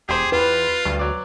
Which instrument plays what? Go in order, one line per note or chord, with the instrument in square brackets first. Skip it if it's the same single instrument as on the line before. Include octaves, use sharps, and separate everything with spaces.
[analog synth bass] E1 [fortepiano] G4 C5 [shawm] G#4
[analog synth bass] E2 [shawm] F4 [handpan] B4
[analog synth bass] D2 [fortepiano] G2
[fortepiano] F#3 D5